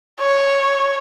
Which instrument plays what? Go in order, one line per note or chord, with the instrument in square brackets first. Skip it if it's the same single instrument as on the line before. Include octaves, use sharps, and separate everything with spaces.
[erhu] C#5